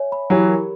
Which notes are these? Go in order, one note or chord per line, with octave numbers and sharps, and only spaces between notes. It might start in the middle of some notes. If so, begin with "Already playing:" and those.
Already playing: C#5 E5 G#5
B5
E3 F#3 G4
A#4